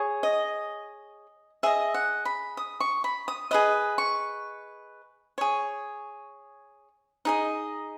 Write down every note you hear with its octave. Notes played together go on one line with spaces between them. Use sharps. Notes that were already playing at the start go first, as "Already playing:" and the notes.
Already playing: G#4 C#5
D#5
G#4 D#5 E5
F#5
B5
D#6
C#6
B5
D#6
G#4 B4 D#5 D#6
C#6
G#4 C#5
D#4 G#4 D#5